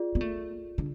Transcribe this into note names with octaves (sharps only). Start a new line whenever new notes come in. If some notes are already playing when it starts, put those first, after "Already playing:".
Already playing: F4 G#4 D5
B3
A3
D3